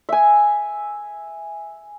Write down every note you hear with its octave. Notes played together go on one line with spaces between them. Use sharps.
E5 G#5